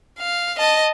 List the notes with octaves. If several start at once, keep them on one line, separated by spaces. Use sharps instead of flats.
F5
D#5 A5